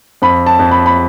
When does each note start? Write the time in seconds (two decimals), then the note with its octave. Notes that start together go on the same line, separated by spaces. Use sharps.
0.22 F2 B5
0.46 A5
0.59 F2
0.71 B5
0.86 B5